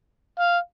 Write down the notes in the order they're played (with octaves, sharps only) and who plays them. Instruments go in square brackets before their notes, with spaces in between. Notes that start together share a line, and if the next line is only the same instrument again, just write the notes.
[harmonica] F5